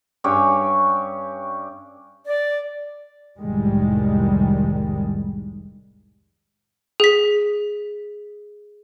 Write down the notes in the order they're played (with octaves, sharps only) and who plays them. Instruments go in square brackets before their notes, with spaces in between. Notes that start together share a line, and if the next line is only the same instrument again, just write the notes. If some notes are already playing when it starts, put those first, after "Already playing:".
[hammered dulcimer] G2 C#4 G4 C#5
[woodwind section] D5
[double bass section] F1 C2 A2 D#3 G3 G#3
[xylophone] G#4 B6